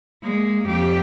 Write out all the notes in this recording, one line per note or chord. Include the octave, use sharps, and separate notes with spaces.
G#3 A#3
F2 G4